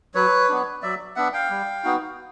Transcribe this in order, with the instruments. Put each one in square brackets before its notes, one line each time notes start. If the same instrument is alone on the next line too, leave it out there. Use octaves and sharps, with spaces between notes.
[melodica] F#3 B4 C#5
B3 D4
F#3 D5 E5
B3 D4 E5 F#5
F5 G5
G3
B3 D#4 F#4